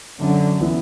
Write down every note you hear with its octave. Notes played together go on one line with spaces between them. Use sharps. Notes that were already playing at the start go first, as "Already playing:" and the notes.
F#2 D3 F#3
E3 B3 E4